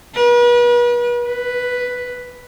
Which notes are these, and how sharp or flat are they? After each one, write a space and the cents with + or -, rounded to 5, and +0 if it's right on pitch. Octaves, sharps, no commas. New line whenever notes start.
B4 -40
B4 +0